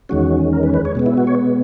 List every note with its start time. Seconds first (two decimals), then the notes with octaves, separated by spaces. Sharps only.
0.09 E2 D#3 G#3 C#4 F#4
0.53 A#4
0.63 B4
0.74 B4
0.85 C#5
0.95 B2 G#3 B3
1.06 E4
1.17 F#4
1.27 C#5